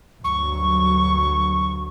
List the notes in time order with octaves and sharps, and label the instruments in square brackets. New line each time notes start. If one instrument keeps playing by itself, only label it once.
[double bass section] D2 G2 F#3 [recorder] C#6